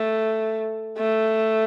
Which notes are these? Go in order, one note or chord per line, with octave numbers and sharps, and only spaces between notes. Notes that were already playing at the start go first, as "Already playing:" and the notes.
Already playing: A3
A3